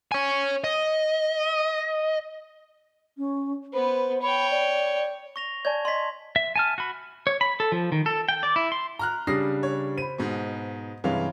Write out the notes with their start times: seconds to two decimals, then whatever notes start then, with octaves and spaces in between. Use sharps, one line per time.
0.12 C#5 G#5
0.64 D#5
3.18 C#4
3.73 B3 B4 C5
4.22 C#5 G5 B5
4.51 D5
5.36 C#6 A#6 F7
5.65 C#5 D5 G#5 A5 C#6 G#6
5.85 D#5 A5 C6 B6
6.36 E5
6.56 G#5 A5 F6
6.78 F#4 B5
7.27 C#5
7.41 B5
7.60 A4
7.72 F3
7.92 D#3
8.06 A4
8.29 G5
8.43 D5
8.56 E4
8.72 C6
8.99 A#5 F6 F#6
9.27 C#3 G3 D4 D#6 A#6 C7
9.63 C#5
9.98 C5 B5 D#7
10.18 G#2 B2
11.04 G2 C3 E3 G#3 C#4 F5